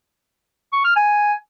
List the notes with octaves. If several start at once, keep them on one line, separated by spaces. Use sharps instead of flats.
C#6
F6
G#5